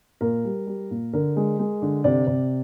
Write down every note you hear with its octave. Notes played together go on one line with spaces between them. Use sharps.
A#2 A#4
G3
G3
A#2
D3 A#4
G#3
G#3
D3
C3 D5
C3